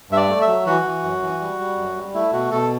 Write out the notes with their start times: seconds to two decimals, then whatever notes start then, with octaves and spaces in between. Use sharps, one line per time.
0.11 G2 E5
0.17 D5
0.29 A3
0.41 E5
0.48 F#3
0.66 E3 F#4
0.85 E3
1.03 F#2
1.22 E3
1.40 G3
1.59 G3
1.78 F#2
1.96 G3
2.14 A3 E4
2.32 B2 F#4
2.51 B2 A4